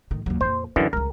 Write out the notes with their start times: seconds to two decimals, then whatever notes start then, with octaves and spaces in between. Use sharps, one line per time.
0.11 A2 D#3
0.26 D#2 F#3
0.41 A#1 F2 C5
0.76 F#2 D3 E3 D4
0.93 C#2 G#3 A#4